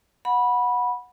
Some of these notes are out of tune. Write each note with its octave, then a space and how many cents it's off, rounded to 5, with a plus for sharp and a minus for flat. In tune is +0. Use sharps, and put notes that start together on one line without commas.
F#5 -20 B5 -15